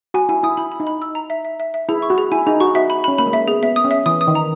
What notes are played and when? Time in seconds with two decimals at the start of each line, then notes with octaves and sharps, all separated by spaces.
0.14 F#4 G#5
0.29 E4 G#5
0.43 E4 D#6
0.57 E4 B5
0.72 B5
0.80 D#4
0.87 B5
1.02 E6
1.15 A#5
1.30 E5
1.45 E5
1.60 E5
1.74 E5
1.89 E4 G#4
2.02 C#6
2.10 F#4
2.18 G#4
2.32 E4 G#5
2.47 D#4 G#4
2.60 F#4 C#6
2.75 F#4 E5
2.90 B5
3.04 C#4 B5
3.18 A#3 B5
3.26 G#3
3.33 A#3 E5
3.48 B3 G#4
3.62 B3 E5
3.76 D#6
3.85 C#4
3.91 E5
4.06 E3 D#6
4.21 D#6
4.27 D#3
4.35 A#5